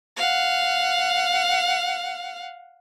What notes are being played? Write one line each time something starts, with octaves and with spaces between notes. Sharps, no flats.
F5 F#5